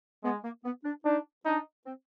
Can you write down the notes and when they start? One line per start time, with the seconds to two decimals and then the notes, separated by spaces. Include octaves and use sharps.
0.24 G#3 B3
0.44 A#3
0.64 B3
0.85 D4
1.05 D4 D#4
1.45 D4 D#4
1.86 C4